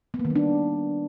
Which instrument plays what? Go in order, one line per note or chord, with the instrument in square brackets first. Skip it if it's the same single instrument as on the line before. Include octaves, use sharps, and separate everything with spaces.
[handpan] B3
A#3
D#3
G3
D4